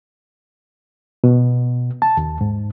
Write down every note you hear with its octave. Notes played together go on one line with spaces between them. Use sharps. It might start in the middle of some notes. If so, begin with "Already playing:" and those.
B2
A5
D#2
G#2